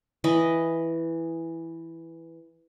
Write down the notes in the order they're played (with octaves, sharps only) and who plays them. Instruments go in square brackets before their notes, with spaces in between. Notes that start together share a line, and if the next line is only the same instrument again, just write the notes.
[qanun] E3 D#5 B5